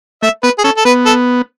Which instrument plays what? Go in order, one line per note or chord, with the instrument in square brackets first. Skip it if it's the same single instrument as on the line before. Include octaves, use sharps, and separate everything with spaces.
[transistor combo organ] A3 [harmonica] E5
[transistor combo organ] B3 [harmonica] B4
[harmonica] G#4
[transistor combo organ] C#4 [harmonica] A4
[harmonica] A4
[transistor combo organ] B3 [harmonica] B4
[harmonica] A4